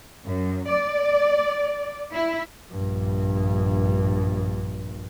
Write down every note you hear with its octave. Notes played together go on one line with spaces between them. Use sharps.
F#2
D5
E4
A#1 G2